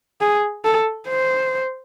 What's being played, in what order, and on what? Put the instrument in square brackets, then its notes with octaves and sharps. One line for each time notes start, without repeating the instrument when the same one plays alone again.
[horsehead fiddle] G#4
A4
C5